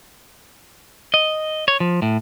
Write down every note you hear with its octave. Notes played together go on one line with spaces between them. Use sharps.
D#5
C#5
F3
A2